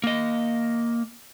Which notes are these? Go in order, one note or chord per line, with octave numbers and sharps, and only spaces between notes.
A#3 D#5